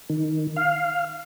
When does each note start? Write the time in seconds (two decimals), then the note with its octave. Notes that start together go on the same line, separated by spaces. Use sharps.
0.10 D#3
0.56 F5